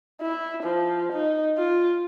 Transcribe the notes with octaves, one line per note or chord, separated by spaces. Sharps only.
E4
F3
D#4
F4